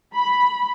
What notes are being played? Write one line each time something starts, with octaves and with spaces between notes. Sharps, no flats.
B5